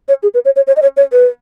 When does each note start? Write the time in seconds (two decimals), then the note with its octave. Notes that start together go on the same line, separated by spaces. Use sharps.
0.08 C#5
0.23 G#4
0.34 B4
0.45 C#5
0.56 C#5
0.67 C#5
0.77 D#5
0.82 C#5
0.97 C#5
1.12 B4